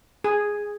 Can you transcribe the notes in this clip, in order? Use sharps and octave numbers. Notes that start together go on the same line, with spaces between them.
G#4